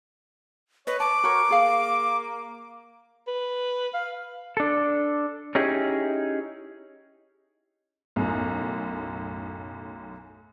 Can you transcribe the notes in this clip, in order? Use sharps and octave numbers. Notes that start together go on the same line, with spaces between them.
B4 C#5 D#5
A5 D6
F#4 A#4 B4 C#5
A#3 G#4 F5
B4
F5
D4 A4
C#4 D#4 E4 G4 G#4
B1 F#2 A2